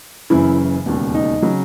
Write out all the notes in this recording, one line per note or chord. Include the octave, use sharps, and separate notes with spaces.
F#1 F#2 C#3 E3 E4
E1 D#2 C#3
D#4
C#3 F#3